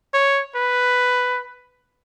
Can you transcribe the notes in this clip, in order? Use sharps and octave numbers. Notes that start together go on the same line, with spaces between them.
C#5
B4